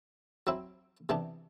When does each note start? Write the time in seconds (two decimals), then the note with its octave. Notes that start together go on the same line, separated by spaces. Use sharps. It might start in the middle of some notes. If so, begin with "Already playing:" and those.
0.47 F#3 C4 E4
1.09 C3 E3 B3 D4